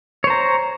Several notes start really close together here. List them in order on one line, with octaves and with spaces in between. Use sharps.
C#5 C5 A#5